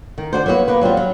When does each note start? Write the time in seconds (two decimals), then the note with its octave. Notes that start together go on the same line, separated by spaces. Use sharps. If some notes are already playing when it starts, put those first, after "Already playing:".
0.18 D#3
0.33 D4 F#4 C5
0.46 F#3 A#3 B3 F#4
0.68 A#3 B3 B4
0.81 F#3 G3 C4 F4
0.97 F#3